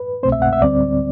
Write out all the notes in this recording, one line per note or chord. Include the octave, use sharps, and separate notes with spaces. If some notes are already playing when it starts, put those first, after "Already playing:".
Already playing: B4
C2 B2 A3 C4 C5
E5
F#5
E5
D2 D3 G3 C4 D5